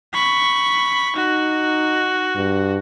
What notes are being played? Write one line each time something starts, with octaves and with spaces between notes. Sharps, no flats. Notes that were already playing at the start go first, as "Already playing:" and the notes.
B5 C#6
D#4 F#4
G2